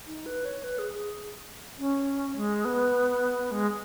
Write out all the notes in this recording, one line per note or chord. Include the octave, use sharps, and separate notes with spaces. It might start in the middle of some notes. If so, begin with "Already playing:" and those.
D#4
B4
C#5
B4
G#4
G#4
C#4
G#3
B3
G#3